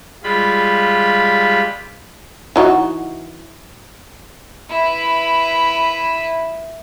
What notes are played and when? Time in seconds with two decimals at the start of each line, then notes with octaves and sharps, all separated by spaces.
0.24 G3 G#3 F4 B5
2.56 E3 D#4 F#4
4.70 E4 B4